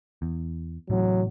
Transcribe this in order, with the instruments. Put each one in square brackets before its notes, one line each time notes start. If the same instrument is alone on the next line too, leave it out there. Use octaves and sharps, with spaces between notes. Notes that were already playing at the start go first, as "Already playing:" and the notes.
[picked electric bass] E2
[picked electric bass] A2 C3 E3 [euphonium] F#3